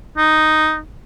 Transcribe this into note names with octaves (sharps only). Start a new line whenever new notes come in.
D#4